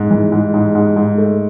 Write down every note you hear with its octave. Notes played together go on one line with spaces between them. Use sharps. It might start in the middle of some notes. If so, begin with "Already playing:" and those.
Already playing: G#2
E3
G#2
G#2
G#2
G#2
A3